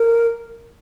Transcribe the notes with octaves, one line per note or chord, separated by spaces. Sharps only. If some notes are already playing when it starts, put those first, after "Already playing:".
Already playing: A#4